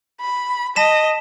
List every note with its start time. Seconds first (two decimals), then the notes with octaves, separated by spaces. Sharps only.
0.21 B5
0.76 D#5 A5 B6 E7